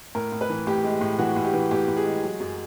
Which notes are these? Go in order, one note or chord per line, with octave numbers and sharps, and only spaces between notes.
A2 A#4
A2
B4
E3
A2 G4
G#3
A2
E3 F#4
A2
G4
E3
A2 G4
A2
G#4
G#3
F#3
F#2